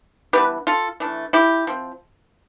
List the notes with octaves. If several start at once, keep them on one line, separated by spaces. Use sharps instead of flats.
E3 G3 B3 D4 G4 B4
F4 A4
E3 A3 D4
E4 G4
F3 C4